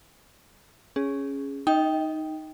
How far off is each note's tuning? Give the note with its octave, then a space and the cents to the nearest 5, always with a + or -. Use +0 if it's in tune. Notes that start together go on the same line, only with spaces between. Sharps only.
C#4 +0 G#4 +0
D#4 +0 D#5 +35 G5 +0